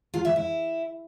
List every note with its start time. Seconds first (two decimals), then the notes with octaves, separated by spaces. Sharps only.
0.14 F4
0.25 E5
0.36 E4